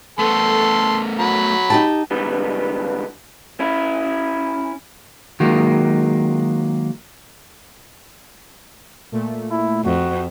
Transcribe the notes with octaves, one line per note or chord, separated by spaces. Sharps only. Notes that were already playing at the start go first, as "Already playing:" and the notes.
A3 B3 A4 C6
F#3 B5
D#4 G4 A5
G#2 D3 E3 G3 B3
C#4 E4
D#3 F#3 G#3 A#3
A#2 A3
E4
F2 F#4